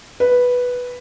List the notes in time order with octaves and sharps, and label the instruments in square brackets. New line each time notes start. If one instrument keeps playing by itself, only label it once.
[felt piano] B4